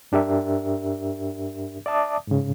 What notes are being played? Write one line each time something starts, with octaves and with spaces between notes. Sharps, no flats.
G2 D4 G4 A#4 E5
D5 E5 A5 D6 D#6
G#2 C#3